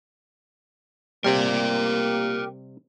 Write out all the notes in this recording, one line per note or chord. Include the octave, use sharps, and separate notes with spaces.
C3 G3 A#3 G4 A#4 D5